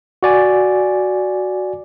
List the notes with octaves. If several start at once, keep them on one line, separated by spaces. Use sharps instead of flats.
F#4 D5 G#5